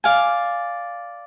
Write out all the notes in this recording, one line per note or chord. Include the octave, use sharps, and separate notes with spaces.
D5 F5 G#5